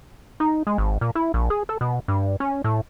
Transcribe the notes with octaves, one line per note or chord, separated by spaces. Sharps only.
D#4
G#3
G#1
A#2
E4
A#1
G#4
A4
B2
G2
C#4
A2